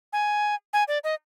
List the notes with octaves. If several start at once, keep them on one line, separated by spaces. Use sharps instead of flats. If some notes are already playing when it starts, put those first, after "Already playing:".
G#5
G#5
D5
D#5